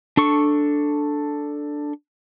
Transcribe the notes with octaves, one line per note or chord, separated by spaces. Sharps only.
D4 A4 C#6